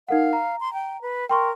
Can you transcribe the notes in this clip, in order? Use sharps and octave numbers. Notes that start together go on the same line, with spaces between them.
D#4 A#4 F5 F#5
A#5
C6
G5
B4
A#4 G5 C6 C#6